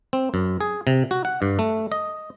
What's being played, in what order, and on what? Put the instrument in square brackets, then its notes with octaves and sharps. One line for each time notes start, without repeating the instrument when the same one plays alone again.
[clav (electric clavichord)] C4
F#2
G#4
C3
F#4
F#5
G2
A3
D#5